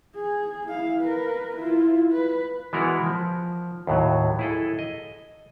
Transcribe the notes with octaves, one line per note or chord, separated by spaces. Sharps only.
G#4
E4 F5
A#4 B4
E4 F4
B4
E3 G#3 B3 E4 F#4 A#4
F3
D#2 A2 F#3
E4 G#4 A4
D#5